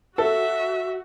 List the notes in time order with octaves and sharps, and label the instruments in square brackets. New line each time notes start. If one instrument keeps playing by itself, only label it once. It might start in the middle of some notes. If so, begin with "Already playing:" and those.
[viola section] F#4 [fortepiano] A4 [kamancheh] E5